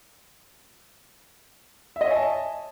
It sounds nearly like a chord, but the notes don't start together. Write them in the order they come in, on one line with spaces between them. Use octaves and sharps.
E5 D#5 C#5 G#5 A5